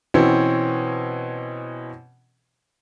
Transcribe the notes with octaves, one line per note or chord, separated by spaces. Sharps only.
B2 E3 C4 C#4